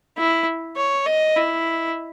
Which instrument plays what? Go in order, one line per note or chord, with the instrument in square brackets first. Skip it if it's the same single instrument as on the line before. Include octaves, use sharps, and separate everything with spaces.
[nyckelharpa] E4
C#5
D#5
E4